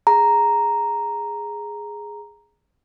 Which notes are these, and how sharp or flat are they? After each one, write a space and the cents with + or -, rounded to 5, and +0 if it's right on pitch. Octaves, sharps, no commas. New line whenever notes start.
G#4 +0 A#5 +0